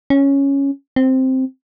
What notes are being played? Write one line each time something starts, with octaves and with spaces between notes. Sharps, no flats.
C#4
C4